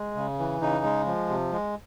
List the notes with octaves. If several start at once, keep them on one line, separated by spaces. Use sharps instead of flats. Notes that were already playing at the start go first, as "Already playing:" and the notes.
Already playing: G#3
C#3
E3
C#3 D#4
G#3
F3
C3
G#3